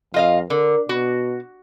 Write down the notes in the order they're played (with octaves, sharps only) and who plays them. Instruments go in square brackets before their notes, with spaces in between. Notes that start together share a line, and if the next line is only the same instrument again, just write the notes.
[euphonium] F2 [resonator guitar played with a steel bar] F4 D#5 F5
[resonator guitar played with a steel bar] D3 [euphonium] A#4
[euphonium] B2 [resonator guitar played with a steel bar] F#4